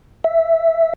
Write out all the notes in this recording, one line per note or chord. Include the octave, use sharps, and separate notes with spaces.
E5